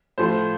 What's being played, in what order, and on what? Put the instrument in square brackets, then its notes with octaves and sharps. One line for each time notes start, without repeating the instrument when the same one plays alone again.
[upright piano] A2 F3 A3 C5